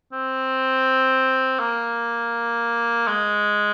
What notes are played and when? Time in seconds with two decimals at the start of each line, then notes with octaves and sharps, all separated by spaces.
0.12 C4
1.59 A#3
3.07 G#3